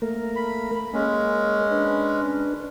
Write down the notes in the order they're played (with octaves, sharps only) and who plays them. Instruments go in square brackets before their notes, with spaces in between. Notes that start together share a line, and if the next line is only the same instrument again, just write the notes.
[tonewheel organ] A3 A#3 A#4
[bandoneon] B5
[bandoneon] G#3 C#4 [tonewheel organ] A#3
[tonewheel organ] D4 B4